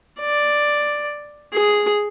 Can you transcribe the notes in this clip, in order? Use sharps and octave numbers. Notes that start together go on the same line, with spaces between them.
D5
G#4